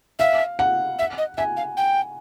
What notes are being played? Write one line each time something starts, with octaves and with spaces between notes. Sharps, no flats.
E5 F5
F#5
E5
D#5
E5 G#5
F5
G5